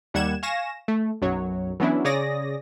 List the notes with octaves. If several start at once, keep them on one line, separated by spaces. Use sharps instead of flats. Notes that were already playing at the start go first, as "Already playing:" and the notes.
D#2 G3 F#5 G#6 E7
F5 G#5 C#6 A#6 E7
A3
B1 F#2 F#3 C#5
E3 F#3 B3 C#4 D4 E4
C#3 G#4 C#5 D5 D#6 A#6